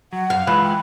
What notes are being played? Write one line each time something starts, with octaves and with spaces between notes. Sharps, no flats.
F#3 F#5
F#2 F5
E3 G#3 F4 F#5 B5
G5